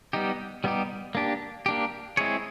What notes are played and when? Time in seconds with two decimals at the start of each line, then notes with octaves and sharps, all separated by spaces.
0.13 G3 B3 D#4 G4
0.64 G3 B3 D#4 G4
1.15 A#3 D4 G4
1.66 A#3 D4 G4
2.17 G#3 C4 E4 G#4 C#5